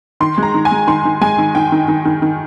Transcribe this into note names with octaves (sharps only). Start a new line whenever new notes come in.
D#3 C6
G#3 A#5
D#3
G#5
G#3
D#3 C6
D#3
G#3 G#5
D#3
D#3 G5
D#3
D#3
D#3
D#3